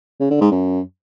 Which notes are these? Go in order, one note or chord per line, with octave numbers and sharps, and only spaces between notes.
C#3
D3
G#2
F#2